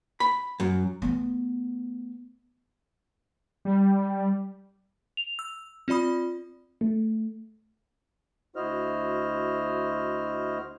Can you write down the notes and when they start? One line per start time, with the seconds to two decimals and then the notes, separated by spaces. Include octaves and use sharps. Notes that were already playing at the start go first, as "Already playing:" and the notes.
0.20 B5
0.60 F#2
1.02 A3 B3
3.65 G3
5.17 F7
5.39 E6
5.88 C4 F4 D5 B5 D#6
6.81 A3
8.56 D2 E4 F#4 C5 D#5 F6